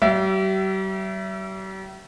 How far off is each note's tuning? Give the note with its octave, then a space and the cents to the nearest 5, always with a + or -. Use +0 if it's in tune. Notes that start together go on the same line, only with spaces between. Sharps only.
G3 -45 G4 -40 E5 +15